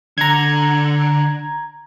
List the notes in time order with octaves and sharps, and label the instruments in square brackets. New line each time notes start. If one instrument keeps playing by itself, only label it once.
[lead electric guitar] D3 [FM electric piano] A#5 G#6